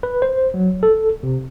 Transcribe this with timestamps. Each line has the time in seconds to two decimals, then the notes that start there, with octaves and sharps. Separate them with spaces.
0.03 B4
0.22 C5
0.54 F#3
0.83 A4
1.23 C3